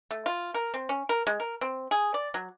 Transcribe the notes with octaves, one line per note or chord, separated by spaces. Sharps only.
A3
F4
A#4
C4
C#4
A#4
G#3
A#4
C4
G#4
D5
F#3